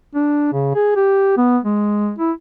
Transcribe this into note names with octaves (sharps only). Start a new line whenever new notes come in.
D4
C#3
G#4
G4
B3
G#3
E4